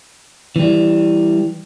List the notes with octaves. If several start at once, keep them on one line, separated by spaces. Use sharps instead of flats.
E3 G3